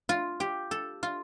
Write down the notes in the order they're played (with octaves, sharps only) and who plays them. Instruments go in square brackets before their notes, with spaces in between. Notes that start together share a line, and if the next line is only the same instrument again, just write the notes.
[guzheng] F4
G4
A4
F4